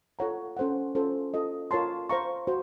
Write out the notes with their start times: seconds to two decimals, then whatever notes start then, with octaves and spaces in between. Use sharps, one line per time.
0.19 F4 A4 C#5 F#5 A#5
0.57 C#4 A4 C5 F#5
0.95 C#4 F4 A4 C5
1.34 F4 A4 D#5
1.71 F4 A#4 C#5 A5 C6
2.09 C5 F5 A#5 C#6
2.47 F#4 C5